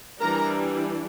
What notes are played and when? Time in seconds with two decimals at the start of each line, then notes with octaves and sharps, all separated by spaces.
0.20 E3 G3 D4 A#4 A#5